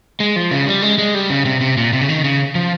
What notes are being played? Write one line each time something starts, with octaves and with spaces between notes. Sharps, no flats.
G#3
F3
C#3
G3
G#3
G#3
G3
C#3
C3
C3
A#2
C3
C#3
D#3
C#3
F3